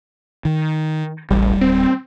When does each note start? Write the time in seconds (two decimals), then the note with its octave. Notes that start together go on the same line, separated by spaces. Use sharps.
0.45 D#3
1.31 D1 A1 G3
1.61 C4